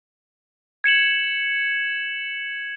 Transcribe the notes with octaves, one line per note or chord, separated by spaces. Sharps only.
G#6 C#7 E7 F#7